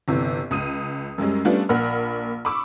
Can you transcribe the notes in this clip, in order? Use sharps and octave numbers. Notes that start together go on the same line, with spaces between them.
G1 C3 E3
C#2 D#6 D#7
F#2 G3 G#3 C#4
G3 A3 B3 C#4 D4 F4
A#1 A#3 F#5 B5 F6
B5 C#6 D6 E6